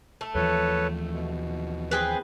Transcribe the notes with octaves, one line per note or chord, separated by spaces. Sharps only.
A3
D#2 E3 F3 A4 B4 C#5
B2
C4 G#4 B4